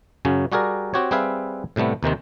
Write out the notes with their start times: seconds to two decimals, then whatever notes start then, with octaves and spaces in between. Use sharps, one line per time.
0.25 F#2 C#3 F#3 C#4
0.52 G3 F#4 G#4 A#4 D5
0.94 C4 F#4 G4 C#5
1.11 G3 C4 G#4 B4 E5 F5
1.76 A2 C3 G3 A3 B3
2.03 D#2 C3 D#3 C4